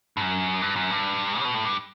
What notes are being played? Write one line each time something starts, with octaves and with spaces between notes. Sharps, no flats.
G2
F#2
G2
F#2
G2
C#3
B2
A2
G2